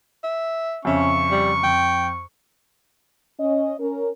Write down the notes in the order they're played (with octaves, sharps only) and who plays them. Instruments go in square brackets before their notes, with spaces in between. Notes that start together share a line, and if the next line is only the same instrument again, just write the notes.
[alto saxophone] E5
[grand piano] F2 C#3 E5 [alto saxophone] C#4 [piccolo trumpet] C#6
[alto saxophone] G3
[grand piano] F2 [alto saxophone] G5
[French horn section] C#4 D#5
C#4 A#4